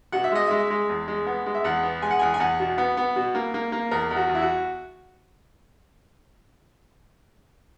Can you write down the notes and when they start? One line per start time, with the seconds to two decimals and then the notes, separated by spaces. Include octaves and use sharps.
0.12 B2 F#5
0.24 E5
0.32 G#3 D#5
0.47 G#3 E5
0.70 G#3
0.89 E2
1.08 G#3
1.27 B3
1.46 G#3
1.55 E5
1.64 E2 F#5
1.83 B3
2.02 G#3 G#5
2.10 F#5
2.19 E2 G#5
2.34 G#5
2.40 E2 F#5
2.60 B2
2.78 B3
2.97 B3
3.16 B2
3.35 A#3
3.54 A#3
3.72 A#3
3.91 E2 A#4
4.11 E2
4.16 F#4
4.29 E2
4.35 E4
4.42 F#4